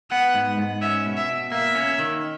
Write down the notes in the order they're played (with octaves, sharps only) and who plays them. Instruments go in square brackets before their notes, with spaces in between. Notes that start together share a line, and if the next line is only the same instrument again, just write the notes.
[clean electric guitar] B3 [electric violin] F#5
[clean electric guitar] G#2
G#2
[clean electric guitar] C#4 [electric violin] E5
[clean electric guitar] B2
[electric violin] E5
[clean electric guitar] B2
[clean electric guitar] A#3 [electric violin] E5
[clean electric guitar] C#4
D#3